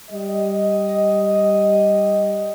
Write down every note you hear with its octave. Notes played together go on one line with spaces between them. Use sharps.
G3 D#5